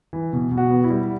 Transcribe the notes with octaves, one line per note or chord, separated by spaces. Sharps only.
E3
B2
B2
F#4
B3
E4
G3